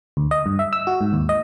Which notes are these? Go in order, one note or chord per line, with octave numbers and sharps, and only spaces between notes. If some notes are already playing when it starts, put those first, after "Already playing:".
D2
D#5
G2
E5
E6
F#4
G#2
D#2
D#5